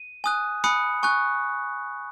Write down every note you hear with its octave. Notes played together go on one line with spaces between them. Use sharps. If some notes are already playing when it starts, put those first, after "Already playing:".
Already playing: D#7
G#5 D#6 F#6
G#5 B5 D#6 F#6 C#7
G#5 C#6 F#6